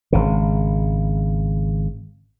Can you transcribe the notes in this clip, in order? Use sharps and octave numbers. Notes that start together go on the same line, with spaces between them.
G#1 C#3